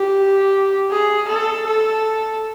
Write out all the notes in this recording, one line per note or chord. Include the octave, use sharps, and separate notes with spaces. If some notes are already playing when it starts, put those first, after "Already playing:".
Already playing: G4
G#4
A4
A4